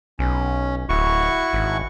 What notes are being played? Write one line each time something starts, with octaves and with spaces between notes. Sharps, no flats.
B1 C#4
D1 E4 F#4 C#6
G#1